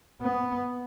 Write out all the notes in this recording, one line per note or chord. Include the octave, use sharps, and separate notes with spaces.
B3